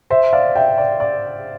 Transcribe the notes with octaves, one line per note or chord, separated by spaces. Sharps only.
C5 E5
D5 F5
E5 G5
D5
D5